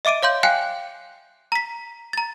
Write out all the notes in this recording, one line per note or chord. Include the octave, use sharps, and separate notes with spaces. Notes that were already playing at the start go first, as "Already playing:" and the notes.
D#5 E5 D6 D7 D#7
C#5 F5 C6 G6
F5 G5 G#5 F#6 C7 C#7
A#5 B6
A#5 A6